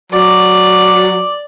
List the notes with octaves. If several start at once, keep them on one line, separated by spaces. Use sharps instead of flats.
F#3 D5